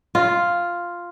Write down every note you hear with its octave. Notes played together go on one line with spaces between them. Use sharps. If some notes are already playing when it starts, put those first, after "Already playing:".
F4